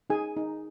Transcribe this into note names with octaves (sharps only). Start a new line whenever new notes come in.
D#4 G#4 G#5
D#4